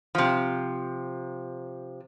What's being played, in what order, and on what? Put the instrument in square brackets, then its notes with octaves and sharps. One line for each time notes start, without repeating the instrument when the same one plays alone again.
[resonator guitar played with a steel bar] C3 F3